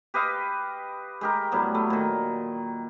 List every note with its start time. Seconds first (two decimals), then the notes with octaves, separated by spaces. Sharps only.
0.14 G4 B4 D#5 F5
1.21 G#3 G4 A#4
1.52 A2 F#3 G3 B3
1.75 A3
1.90 A#2 D#3